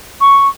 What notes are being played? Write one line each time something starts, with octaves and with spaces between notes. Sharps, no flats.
C#6